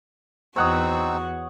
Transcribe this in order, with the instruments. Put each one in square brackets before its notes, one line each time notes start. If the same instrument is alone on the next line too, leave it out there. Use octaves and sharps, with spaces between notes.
[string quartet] E2 F#4 [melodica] C4 D#4 E6 [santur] C#5 F#5 D#6